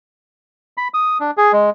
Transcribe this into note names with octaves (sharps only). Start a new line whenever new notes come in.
B5
D#6
D4
G#4
G#3